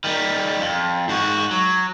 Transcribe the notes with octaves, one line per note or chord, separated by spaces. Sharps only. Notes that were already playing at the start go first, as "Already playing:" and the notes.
D#3 G3
F2
G#2 F#4
F#3